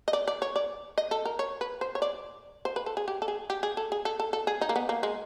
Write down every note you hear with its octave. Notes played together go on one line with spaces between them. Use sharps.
D#5
D5
D5
C#5
D5
D#5
A4
A#4
C#5
B4
C5
C#5
D5
C5
B4
A4
G#4
G4
A4
G#4
G4
G#4
A4
G#4
A4
A4
A4
G#4
D#4
A#3
B3
A#3
G#3